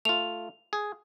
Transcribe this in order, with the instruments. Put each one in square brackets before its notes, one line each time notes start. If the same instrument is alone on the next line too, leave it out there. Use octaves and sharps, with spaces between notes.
[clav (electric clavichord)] A3 F4 [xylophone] F7
[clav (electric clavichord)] G#4